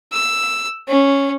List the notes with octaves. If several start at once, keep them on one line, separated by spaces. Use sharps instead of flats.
E6
C#4